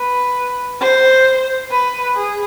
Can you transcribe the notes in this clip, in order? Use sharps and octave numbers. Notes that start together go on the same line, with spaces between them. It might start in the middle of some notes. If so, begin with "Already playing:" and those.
Already playing: B4
C5
B4
G#4